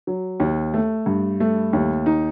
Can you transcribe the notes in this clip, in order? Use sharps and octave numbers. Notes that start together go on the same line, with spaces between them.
F#3
D#2
A3
G2
A3
D#2
D#4